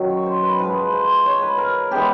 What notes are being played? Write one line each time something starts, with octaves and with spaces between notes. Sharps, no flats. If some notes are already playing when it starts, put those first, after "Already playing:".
Already playing: F#2 D#3 F#3
C#5
C5
B4
G#2 F3 G#3 B4
C5
C#5
B4
A#4
E3 G#3 B3 D4 G4